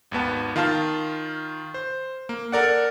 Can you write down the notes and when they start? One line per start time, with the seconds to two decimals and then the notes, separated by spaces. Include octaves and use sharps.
0.12 G#1 D#2 B3 A5
0.56 D#3 F4 F5 A5 F6
1.74 C5
2.29 A#3
2.52 A4 A#4 D5 F#5